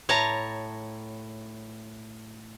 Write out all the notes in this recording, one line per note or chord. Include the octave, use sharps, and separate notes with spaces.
A2 C#5 A5 A#5